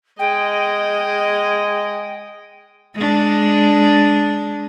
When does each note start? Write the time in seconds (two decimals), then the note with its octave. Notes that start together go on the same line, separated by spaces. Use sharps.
0.19 G#3 D#5 G5
2.95 G#3 D4